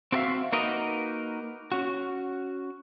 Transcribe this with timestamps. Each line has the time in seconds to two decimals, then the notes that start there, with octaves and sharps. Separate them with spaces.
0.12 C4 F#4 A4 A#4 E5 F5
0.52 A#3 D#4 F#4 A#4 B4 D#5
1.72 C#4 F#4